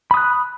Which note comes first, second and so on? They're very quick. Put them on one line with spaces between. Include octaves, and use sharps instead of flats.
B5 D#6 F#6